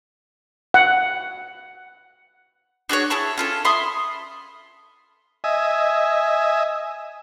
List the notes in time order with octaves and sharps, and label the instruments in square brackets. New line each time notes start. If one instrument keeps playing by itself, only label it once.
[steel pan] F#5
[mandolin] D4 F#4 G#4 C#5
E4 G#4 A5 C#6
C#4 F4 A4
E5 B5 C6 D#6
[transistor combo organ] D#5 E5 G#5